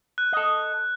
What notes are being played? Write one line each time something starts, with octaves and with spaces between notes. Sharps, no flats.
F#6
A4 D#5